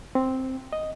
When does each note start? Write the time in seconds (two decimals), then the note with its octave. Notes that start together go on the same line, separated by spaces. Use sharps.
0.15 C4
0.73 D#5